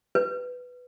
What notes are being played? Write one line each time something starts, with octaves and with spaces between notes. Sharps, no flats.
B4